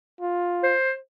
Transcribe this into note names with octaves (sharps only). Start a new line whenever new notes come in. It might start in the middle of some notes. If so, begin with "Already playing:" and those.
F4
C5